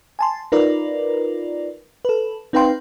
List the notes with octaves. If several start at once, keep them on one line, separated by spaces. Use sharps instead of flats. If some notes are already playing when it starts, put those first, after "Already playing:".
G#5 A5 C6
D#4 F4 A#4 B4 D5
A4 B4
C4 D#4 B4 F5 G5 C6